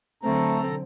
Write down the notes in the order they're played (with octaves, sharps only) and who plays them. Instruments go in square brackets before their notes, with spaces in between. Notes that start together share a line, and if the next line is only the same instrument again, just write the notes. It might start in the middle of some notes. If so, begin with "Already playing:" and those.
[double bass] D3 F#3 [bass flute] A3 [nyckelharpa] C4 [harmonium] A4 A#5